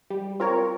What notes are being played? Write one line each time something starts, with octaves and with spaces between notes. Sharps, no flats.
G3
C4 F4 A#4 C#5